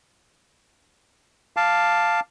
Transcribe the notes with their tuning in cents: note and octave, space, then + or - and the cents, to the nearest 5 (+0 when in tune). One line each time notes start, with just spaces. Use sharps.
F5 +0 A5 +5 D6 +0